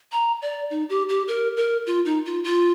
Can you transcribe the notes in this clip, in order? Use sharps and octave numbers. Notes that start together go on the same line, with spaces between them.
A#5
D5
D#4
G4
G4
A#4
A#4
F4
D#4
F4
F4